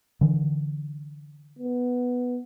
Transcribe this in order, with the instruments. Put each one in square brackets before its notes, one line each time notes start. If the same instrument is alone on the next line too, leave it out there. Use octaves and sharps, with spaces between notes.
[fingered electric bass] D3 E3
[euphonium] B3